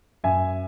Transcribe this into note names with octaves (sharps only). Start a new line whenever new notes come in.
F#2 E5 G#5